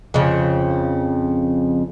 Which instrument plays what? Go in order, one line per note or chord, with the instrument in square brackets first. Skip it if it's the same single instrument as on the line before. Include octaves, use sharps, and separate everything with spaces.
[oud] F2 C#3